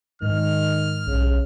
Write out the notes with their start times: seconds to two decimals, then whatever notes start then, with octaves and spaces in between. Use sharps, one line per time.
0.22 G#2 D#3 F6
1.07 B1 C#3